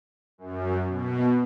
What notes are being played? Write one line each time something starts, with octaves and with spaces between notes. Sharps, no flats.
F#2
B2